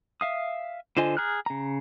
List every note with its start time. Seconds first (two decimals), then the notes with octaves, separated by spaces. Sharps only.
0.21 E5 F5 D#6
0.97 D3 F4 C5 D#5 G#5
1.17 G#4 A#5 F6 F#6
1.46 C#3 A#5